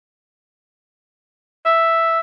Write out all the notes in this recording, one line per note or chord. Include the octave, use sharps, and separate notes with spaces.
E5